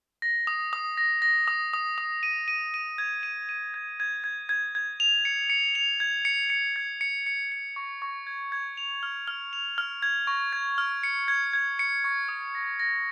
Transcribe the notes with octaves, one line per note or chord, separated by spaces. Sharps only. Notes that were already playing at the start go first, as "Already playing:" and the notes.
A#6
D#6
D#6
A#6
A#6
D#6
D#6
D#6
D#7
D#7
D#7
G#6
D#7
D#7
G#6
G#6
G#6
G#6
G#6
F7
C#7
C#7
F7
G#6
C#7
C#7
G#6
C#7
C#7
C#7
C#6
C#6
G#6
G#6
F7
F6
F6
F7
F6
G#6
C#6
G#6
F6
C#7
G#6
G#6
C#7
C#6
D#6
A#6
A#6